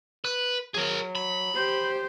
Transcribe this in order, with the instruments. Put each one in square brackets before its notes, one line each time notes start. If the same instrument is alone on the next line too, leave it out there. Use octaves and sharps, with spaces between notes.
[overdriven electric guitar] B4
[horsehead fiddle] F#3 [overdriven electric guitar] G#4 A#4
[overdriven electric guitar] B5
[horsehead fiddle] G4 C5